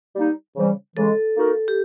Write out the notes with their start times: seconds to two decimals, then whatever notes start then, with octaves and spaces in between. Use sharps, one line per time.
0.16 G3 A#3 D#4
0.56 C#3 E3 G3 C4
0.96 C#3 E3 G#3 A4
1.36 A#3 D#4 F#4 A#4
1.68 G4